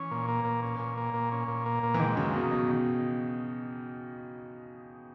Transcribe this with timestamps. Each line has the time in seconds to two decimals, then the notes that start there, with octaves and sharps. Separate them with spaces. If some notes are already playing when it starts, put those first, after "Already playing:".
Already playing: E3 C#4
0.11 A#2
0.28 A#3
0.45 A#2
0.62 C#4
0.80 A#2
0.97 A#3
1.14 A#2
1.32 C#4
1.48 A#2
1.66 A#3
1.83 A#2
1.94 E3
2.00 D#3 G#3
2.17 F#2 C#3
2.33 B2 D#3
2.51 B2